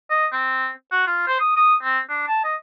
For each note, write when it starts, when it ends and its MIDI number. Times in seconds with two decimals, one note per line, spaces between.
0.10 0.26 75
0.33 0.69 60
0.92 1.05 66
1.07 1.26 65
1.27 1.38 72
1.40 1.52 87
1.56 1.75 87
1.83 1.99 60
2.09 2.23 62
2.28 2.43 81
2.44 2.55 75